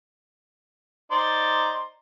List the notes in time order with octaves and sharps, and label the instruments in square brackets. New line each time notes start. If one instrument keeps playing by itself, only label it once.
[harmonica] D#4 C5 D5